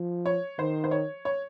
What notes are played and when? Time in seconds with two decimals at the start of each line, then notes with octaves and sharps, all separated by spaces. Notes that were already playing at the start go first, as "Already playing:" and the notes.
Already playing: F3
0.26 C#5
0.59 D#3 C5
0.84 C5
0.91 C#5
1.25 C#5